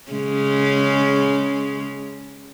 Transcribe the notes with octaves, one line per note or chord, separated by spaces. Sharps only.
C#3 G#3 C#4